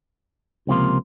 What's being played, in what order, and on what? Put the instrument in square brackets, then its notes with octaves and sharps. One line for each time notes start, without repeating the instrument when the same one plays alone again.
[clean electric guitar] C#2 C3 F3 A#3 F4